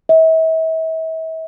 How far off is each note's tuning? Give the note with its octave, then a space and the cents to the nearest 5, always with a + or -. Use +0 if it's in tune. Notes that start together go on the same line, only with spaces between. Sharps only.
E5 -40